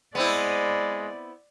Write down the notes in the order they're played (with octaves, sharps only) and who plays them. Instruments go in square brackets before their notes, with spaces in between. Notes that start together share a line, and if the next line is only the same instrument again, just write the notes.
[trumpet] G#3 [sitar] B3 C4 E4 [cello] D5